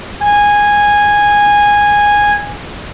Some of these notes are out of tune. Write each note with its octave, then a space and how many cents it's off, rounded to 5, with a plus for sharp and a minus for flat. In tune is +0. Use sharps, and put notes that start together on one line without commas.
G#5 -10